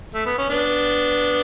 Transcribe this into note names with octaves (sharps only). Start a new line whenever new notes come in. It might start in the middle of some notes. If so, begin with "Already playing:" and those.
A3
B3
C#4
B3 D4